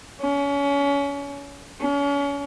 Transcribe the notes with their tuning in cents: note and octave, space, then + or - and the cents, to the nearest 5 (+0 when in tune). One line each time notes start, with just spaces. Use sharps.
C#4 +30
C#4 +35